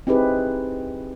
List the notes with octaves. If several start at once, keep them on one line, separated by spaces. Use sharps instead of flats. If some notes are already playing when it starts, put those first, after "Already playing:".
C4 D#4 E4 G4 G#4 B4